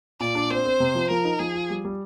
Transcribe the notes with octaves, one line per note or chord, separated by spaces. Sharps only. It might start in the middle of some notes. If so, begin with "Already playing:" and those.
A#2 D5
D4
C4 C5
C4
C3
F3
F3 A#4
D#4
F3 G#4
F4
G3
G3